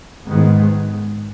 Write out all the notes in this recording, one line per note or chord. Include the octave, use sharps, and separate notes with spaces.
G#2 D#3 G#3 B3